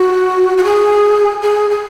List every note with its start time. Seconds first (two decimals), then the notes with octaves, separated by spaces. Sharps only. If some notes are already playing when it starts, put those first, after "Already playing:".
Already playing: F#4
0.58 F#4
0.64 G#4
1.42 G#4
1.70 G#4